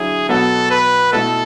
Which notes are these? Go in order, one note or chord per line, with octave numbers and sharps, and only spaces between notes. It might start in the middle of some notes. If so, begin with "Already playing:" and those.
Already playing: D3 F#3 E4 G#4
B2 F#3 B3 A4
B4
B2 A3 E4 A4